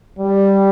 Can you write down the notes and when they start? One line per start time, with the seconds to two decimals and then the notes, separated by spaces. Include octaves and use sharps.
0.19 G3